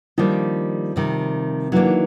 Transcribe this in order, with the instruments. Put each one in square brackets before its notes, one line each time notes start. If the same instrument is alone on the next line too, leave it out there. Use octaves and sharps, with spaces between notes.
[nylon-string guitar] D#3 G3 A#3 D4 [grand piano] F3
[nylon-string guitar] C3 D#3 G3
[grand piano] E3 [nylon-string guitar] F#3 A#3 D4
[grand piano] D#3